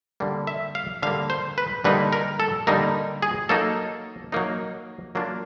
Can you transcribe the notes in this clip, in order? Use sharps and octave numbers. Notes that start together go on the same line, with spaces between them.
D3 G3 A#3
E5
F5
D3 G3 A#3 F5
C5
B4
D3 G3 A#3 D#4 B4
A#4
A4
D3 G3 A#3 D#4 A#4
G#4
F#3 A#3 D#4 A4
F#3 A#3 D#4
F#3 A#3 D4 F4